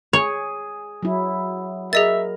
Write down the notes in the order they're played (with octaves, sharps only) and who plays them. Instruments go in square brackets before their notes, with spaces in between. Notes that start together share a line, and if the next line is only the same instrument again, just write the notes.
[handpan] G#4 [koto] C#5
[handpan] F#3 E4
[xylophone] G#4 D#5 A6 [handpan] A#4 [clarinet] E5